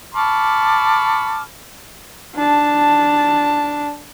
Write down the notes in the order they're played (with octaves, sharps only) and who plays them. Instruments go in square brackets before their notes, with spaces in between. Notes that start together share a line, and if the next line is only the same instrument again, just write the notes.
[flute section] A5 D6 F6 [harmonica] B5 C#6
[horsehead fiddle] D4 A5